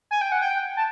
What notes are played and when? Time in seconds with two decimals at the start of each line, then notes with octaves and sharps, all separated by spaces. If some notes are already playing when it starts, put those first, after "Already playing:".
0.11 G#5
0.21 G5
0.32 F#5
0.42 G5
0.77 A5